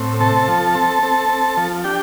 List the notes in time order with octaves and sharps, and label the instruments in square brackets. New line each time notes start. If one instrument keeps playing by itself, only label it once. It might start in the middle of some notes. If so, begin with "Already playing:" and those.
Already playing: [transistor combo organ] A2 C4
C3 A4 A5
F3
C4
C4
C4
F3
D4 G4 G5